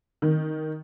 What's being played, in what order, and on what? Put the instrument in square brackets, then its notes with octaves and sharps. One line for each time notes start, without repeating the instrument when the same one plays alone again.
[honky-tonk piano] D#3